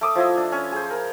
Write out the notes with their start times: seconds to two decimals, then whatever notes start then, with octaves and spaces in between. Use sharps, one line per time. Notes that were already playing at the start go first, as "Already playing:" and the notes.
0.01 A3 D6 D#6
0.15 F3 E4 D#5
0.37 D4
0.52 C#4
0.72 G#4 C5
0.90 A#4